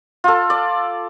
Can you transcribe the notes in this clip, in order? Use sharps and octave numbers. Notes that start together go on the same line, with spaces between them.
F4 A4
D5